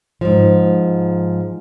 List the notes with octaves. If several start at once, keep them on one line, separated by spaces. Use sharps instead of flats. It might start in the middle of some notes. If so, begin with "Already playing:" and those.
G#2 F3